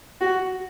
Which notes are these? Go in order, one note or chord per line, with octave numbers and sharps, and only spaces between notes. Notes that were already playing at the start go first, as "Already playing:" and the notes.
F#4